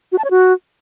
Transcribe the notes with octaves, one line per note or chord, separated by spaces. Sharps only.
F#4
A5
C#5
F#4